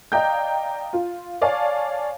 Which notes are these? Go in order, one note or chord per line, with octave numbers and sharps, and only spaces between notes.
D5 D#5 F5 G5 A#5 G6
F4
C#5 D5 F5 G#5 A5